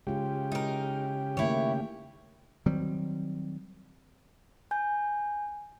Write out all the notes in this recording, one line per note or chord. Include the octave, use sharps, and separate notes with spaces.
C#3 G#3 F4 G4
G#3 D#4 E4 A#4
D#3 A3 A#3 E4 C#5
D#3 F#3 G3 C4
G#5 G6